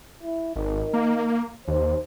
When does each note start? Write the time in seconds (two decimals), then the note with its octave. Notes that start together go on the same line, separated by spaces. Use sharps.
0.23 E4
0.56 G#1 D#3
0.93 A#3
1.68 D#2 C5